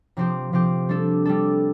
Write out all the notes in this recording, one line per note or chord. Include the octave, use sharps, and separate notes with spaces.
C3 F3 C4 G4
C3 F3 C4 G4
G3 D4 A4
G3 D4 A4